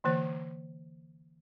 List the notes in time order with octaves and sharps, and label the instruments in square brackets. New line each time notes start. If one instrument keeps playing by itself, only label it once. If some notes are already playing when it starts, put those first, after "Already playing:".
[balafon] D3 E3 A#3 C5